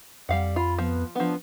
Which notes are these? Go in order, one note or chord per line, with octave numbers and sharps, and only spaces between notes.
F2 G3 F5 F#5
F4 B5
F3 B3
F3 B3 D4